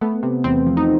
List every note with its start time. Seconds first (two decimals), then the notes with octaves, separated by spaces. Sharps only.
0.01 A3 B3
0.23 C3
0.44 E2 C4
0.66 F3
0.77 D#4